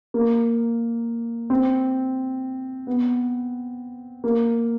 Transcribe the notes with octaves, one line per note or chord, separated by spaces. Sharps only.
A#3
C4
B3
A#3